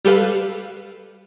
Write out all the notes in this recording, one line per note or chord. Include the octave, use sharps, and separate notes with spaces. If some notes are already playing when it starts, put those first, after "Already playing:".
G3 G4 A4 B4 F5